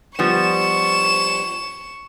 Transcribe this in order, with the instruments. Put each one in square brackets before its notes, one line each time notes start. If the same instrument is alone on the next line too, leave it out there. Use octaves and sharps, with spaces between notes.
[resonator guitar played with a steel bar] F3 G3 B3 [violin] C#6 E7